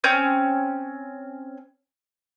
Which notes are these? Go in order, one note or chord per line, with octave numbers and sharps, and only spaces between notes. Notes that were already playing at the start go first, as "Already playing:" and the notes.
C4 C#4 G6